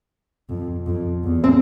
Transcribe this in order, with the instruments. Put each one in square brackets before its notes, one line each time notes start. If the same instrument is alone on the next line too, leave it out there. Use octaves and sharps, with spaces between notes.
[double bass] F2
F2
E2
[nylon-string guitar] C4